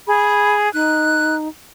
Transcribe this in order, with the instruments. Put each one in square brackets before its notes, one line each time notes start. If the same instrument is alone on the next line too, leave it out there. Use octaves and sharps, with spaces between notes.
[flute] G#4 [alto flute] B5
[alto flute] D#4 [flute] F#6